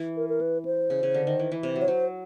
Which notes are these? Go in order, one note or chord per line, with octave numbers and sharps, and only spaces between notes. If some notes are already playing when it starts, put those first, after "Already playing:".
Already playing: E3
A#4
A#4
B4
C5
C#3
C#3
D3
D#3
E3
E3
C3
F#3
C#5
F#3 C5